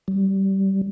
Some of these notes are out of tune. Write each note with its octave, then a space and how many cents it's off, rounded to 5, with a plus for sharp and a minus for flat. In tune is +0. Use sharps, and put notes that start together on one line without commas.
G3 -20